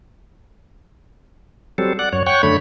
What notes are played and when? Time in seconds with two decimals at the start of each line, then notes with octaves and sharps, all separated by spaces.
1.78 F#3 G3 C4 A4
1.99 D5 F#5
2.13 F#2 C#5
2.26 C#5 F#5 G5 C#6
2.43 F#2 D3 A3 C#5 B5